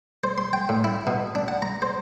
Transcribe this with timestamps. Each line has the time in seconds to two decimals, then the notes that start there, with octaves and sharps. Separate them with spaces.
0.24 C5
0.38 C6
0.53 G5
0.69 A2
0.84 E4
1.07 B2
1.35 D4
1.48 F#5
1.62 A#5
1.82 C5